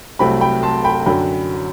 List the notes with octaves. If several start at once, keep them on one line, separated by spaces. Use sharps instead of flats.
C2 C3 F#3 A3 G5 B5
G5 B5
A5 C6
G5 B5
F#2 D3 F#3 G5 B5